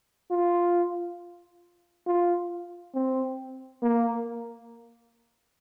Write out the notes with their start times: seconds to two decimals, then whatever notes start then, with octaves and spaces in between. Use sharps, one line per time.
0.31 F4
2.07 F4
2.94 C4
3.82 A#3